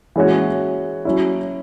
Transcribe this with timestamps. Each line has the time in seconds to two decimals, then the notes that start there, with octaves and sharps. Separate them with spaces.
0.16 E3 G#3 C#4 F#4 C#5
1.05 F#3 C#4 E4